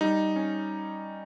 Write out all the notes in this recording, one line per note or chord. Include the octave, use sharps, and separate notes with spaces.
G3 D#4
C#4